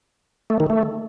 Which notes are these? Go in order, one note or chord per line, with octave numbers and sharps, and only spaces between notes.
A3
D#3
A3